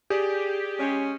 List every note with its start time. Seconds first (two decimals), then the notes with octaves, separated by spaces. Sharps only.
0.10 G4 G#4 D5
0.79 G#3 C#4